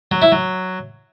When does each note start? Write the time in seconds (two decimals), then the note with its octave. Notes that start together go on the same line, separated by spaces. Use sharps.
0.11 F#3
0.22 E4
0.32 F#3